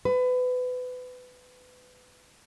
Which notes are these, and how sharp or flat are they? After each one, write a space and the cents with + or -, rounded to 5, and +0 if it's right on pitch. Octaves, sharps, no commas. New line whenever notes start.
B4 +25